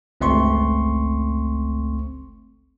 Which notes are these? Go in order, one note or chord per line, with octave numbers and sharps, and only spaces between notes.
G1 C#2 A3 C4 C6 C#6